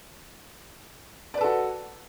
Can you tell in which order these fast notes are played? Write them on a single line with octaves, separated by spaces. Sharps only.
D5 B4 A4 F#4